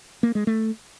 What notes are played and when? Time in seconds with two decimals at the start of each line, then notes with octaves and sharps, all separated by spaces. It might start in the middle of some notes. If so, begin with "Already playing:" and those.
0.23 A#3
0.35 G#3
0.47 A3